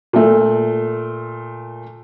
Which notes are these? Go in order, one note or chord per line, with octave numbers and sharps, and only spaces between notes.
A#2 A3